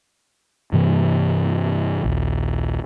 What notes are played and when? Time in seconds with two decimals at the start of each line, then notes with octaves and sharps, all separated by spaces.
0.72 G2 C3 E3 A#3
2.04 A#1 D#2